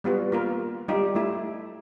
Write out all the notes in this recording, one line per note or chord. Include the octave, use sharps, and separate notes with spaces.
G3 B3 F4 F#4
A#3 F4 A#4
G3 D#4 F4 G4
A3 E4